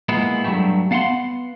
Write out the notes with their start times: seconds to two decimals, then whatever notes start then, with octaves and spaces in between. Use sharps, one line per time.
0.09 A#2 G#3 B3 E4
0.44 G2 E3 F#3 A3 G4
0.91 B3 F5 F#5 A5 C6